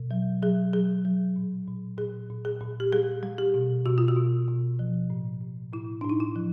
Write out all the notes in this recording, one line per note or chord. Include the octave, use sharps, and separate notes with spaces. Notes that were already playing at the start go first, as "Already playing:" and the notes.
Already playing: B2
F#3
F#3 G#4
F#3 G#4
F#3
A#2
A#2
A#2 G#4
A#2
G#4
A#2
G4
G3 G#4
G3
G4
B2
B2 F#4
F4
F#4
B2
B2
F3
A2
A2
A2 E4
A2 D4
D#4
E4
F3